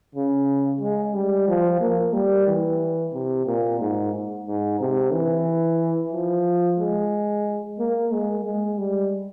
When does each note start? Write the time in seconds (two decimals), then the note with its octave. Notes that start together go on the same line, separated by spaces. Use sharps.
0.15 C#3
0.81 G#3
1.14 G3
1.48 F3
1.81 A#3
2.14 G3
2.47 E3
3.13 C3
3.47 A#2
3.80 G#2
4.47 G#2
4.80 C3
5.13 E3
6.12 F3
6.79 G#3
7.79 A#3
8.12 G#3
8.45 G#3
8.78 G3